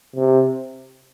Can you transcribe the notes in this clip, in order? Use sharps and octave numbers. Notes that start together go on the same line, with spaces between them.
C3